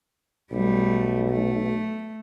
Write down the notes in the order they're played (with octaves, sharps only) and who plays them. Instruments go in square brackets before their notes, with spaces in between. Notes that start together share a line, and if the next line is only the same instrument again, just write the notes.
[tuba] B1 [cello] G3 A3
[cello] A3